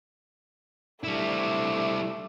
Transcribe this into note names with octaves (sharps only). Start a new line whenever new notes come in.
G3 A3 D4 E4